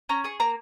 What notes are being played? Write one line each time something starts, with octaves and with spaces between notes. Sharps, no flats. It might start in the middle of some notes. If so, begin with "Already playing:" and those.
C#4 A#5
G#4 C#6
A#3 A#5